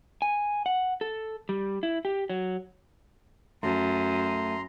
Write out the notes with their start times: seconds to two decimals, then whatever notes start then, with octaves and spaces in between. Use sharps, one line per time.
0.22 G#5
0.66 F#5
1.01 A4
1.49 G3
1.83 E4
2.05 G4
2.30 F#3
3.63 F#2 A3 A#5 C6